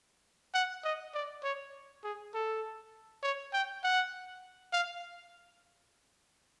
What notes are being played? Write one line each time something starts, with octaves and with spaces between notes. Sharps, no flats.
F#5
D#5
D5
C#5
G#4
A4
C#5
G5
F#5
F5